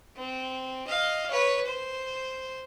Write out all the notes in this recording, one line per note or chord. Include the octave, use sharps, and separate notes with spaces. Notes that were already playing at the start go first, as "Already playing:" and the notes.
C4
D#5 F5
B4 C#5
C5